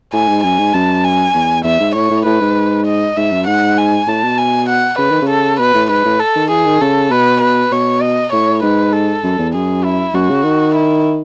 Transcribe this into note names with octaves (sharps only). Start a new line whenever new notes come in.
A2 G#5
G#2
F#2 G#5
G#2
F#2 A5
G#5
E2
E2 E5
G#2
A2 C#5
A2
A2 B4
G#2
D#5
G#2 E5
F#2
G#2 F#5
G#5
A2 A5
B2
G#5
F#5
C#3 B4
D#3
C#3
A4
B2 B4
A2
G#2 B4
A2
A4
D#3
E3 G#4
D#3
C#3 A4
B2 B4
B4
B2 C#5
D#5
A2 C#5
G#2 B4
A4
F#2
E2
F#2 G#4
E4
F#2 F#4
C#3
D#3
E4